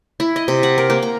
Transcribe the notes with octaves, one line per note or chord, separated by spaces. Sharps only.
E4
D#5
C3
F#5
A#4
A#3
A#5